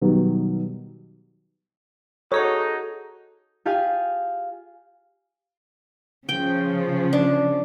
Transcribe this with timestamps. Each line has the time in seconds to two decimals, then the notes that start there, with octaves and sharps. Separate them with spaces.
0.01 B2 D#3 F#3 G3
2.32 D#4 F#4 G#4 A4 C#5 F#5
3.65 F4 G4 G#4 F5 G#5
6.29 C#3 F3 G5
7.13 D4